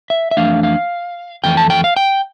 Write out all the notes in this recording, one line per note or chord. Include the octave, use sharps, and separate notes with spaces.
E5
E5
F2 E3 A3 D4 F5
F5
F2 E3 A3 G5
A5
G5
F5
G5